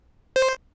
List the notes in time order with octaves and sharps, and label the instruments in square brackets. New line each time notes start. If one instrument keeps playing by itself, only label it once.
[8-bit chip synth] C5